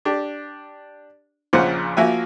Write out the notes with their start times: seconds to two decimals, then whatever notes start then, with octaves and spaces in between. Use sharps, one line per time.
0.05 D4 G4
1.53 A#1 A#2 C#3 C5 F#5
1.97 F3 A#3 F#4 E5 G#5